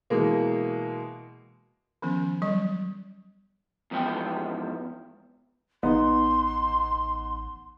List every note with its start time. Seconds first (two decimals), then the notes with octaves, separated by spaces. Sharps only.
0.10 B2 E3 G#3 A#3
2.02 D#3 F3 B3 C#4
2.42 F#3 G3 D#5
3.91 E2 G#2 F3 B3 G5
5.83 A1 B3 D#4 C6